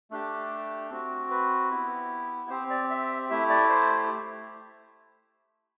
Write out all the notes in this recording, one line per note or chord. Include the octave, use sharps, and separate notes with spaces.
A3 D4 G4
C4 F#4
B4
B3 E4 G4
C4 G4 C5
D5
E5
A3 E4 G4 E5
D5
C5